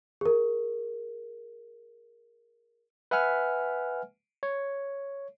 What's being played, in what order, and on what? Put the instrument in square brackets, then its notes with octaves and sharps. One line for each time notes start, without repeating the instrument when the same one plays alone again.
[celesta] G#4 A#4
[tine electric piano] B4 E5 F#5 G#5 F6
C#5